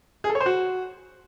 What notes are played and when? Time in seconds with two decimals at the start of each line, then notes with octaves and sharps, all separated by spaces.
0.24 G#4
0.30 A4
0.35 C#5
0.40 C5
0.46 F#4